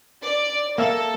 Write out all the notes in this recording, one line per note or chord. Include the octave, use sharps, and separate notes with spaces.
D5
A#3 A4 E5